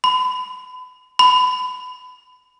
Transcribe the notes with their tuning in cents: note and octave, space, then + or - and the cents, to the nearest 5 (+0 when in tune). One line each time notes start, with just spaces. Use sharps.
B5 +35
B5 +25